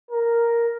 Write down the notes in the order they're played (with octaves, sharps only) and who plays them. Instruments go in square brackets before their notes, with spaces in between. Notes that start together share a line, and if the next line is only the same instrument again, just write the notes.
[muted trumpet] A#4